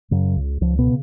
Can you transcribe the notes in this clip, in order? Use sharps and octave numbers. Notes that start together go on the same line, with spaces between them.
F#2 C#3 F#3
C#2
C#2 F3
B2 B3
C#3